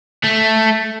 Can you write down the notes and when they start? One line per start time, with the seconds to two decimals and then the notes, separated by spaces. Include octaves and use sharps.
0.24 A3